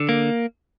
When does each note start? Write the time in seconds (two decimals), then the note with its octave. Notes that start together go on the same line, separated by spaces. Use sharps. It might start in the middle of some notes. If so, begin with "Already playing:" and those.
Already playing: D3
0.09 A#3